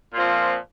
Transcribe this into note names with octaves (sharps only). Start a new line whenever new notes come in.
A#2 F3 C4 F4